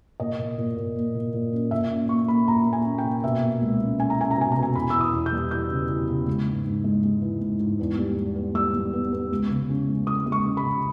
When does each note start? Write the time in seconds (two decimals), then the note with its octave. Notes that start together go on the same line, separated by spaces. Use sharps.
0.20 A#2 D#5
0.39 A#2
0.58 A#2
0.77 A#2
0.96 A#3
1.15 A#2
1.34 A#2
1.53 C#4
1.71 A#2 E5
1.90 C#4
2.09 A#3 C#6
2.28 A#3 B5
2.47 A#2 A#5
2.67 A#3
2.73 G#5
2.85 C#4
2.98 G5
3.04 A#2
3.24 B2 E5
3.42 A#3
3.61 C#2
3.81 C#4
3.99 C#4 G#5
4.10 A#5
4.18 C#4 G#5
4.31 A#5
4.37 B2 G#5
4.52 A#5
4.57 B2
4.63 G#5
4.75 E2 B5
4.90 E3 E6
5.01 D#6
5.13 E2
5.26 G6
5.32 G3
5.51 E3 G6
5.71 C#3
5.89 E3
6.09 C#3
6.27 G#3
6.46 G#2
6.65 G#2
6.84 G#3
7.03 G#3
7.22 E3
7.41 G#2
7.60 G#2
7.79 E2
7.98 G3
8.17 G3
8.35 B3
8.55 G3 E6
8.74 G3
8.93 B3
9.12 B3
9.31 C#2
9.50 C#3
9.69 C#4
9.88 G#3
10.07 G#3 D#6
10.26 G#3
10.32 C#6
10.45 C#4
10.57 B5
10.64 C#3